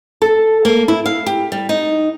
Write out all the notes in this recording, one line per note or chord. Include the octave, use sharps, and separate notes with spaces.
A4
A#3
E4
F5
G4
G3
D#4